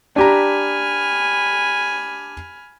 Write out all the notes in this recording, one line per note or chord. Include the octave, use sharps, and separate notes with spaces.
D4 G4 G#5 A#5 B5 F6